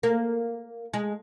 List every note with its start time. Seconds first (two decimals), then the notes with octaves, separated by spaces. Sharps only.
0.03 A#3
0.94 G#3